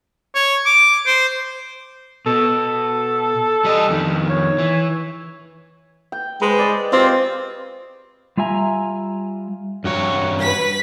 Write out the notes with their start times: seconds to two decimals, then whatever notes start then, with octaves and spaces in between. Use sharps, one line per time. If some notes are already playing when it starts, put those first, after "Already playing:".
0.35 C#5
0.66 D6
1.07 C5
2.26 B2 A4
3.65 G3 D#5
3.89 F2 D#3
4.30 C#5
4.58 E3
6.12 G5
6.41 G#3 B4 C5
6.59 D5 D#5
6.93 C4 F4 G4
8.37 G3 F4 E5 G#5 A#5
9.84 G2 F#4 C#5
10.42 B4 B6